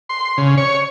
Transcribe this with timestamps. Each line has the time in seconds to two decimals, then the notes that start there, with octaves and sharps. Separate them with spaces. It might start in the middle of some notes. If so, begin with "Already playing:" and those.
0.09 C6
0.38 C#3
0.57 C#5